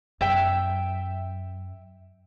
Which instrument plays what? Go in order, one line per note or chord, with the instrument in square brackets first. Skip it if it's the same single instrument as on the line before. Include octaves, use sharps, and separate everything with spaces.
[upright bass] F#2 [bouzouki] E5 G5